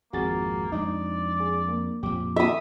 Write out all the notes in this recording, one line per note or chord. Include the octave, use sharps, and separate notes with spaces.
G#1 F2 G#2 A#3 F#4 G#4 A6
F2 G#3 D4 D#4 D5
G#4
A#3
F2 A#2 G4 D6
E5 D#6